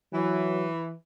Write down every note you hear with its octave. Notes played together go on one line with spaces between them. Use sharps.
E3 F#3